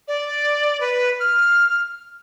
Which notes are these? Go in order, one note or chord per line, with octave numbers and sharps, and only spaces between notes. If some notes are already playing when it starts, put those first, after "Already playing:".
D5
B4
F6